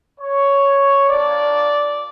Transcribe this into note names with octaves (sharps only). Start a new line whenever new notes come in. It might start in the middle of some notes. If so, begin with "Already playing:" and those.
C#5
A#3 D4 F4 D5